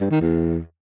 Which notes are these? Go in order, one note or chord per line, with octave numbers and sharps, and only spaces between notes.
G2
D#3
E2